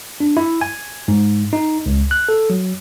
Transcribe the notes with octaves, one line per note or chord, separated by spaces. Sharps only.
D4
E4
G#5
G#2
D#4
C#2
F#6
A4
F#3